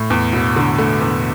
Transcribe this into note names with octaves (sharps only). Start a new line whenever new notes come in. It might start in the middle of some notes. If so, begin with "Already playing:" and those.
Already playing: A2
E2
E1
D3
A3
E2